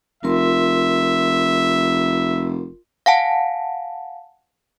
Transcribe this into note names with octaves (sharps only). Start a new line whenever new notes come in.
F1 F4 A#4 E5 C6
F5 F#5 G#5 A5